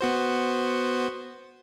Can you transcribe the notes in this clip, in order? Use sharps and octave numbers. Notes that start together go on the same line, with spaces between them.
B3 F#4 C5